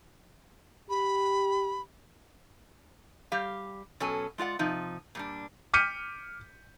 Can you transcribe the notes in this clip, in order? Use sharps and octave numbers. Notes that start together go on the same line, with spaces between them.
G4 B5
G3 G4 F5
B2 F#3 C#4 A4 G#5
G#3 F4 D5 F#5
C3 F3 D#4
A#2 G3 D4
D6 F6 G6 B6 C#7 D#7